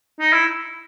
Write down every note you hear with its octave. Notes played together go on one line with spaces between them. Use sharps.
D#4
E4